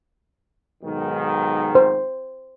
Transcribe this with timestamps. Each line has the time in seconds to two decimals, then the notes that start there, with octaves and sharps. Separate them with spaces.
0.83 B1 G#2 D#3
1.75 C5